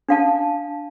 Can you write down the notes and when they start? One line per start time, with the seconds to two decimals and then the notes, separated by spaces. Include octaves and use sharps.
0.09 D4 F5 A5